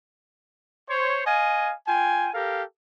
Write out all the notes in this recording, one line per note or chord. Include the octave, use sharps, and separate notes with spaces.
C5 C#5
D#5 F5 G#5
F4 G5 G#5
G4 A4 A#4 F5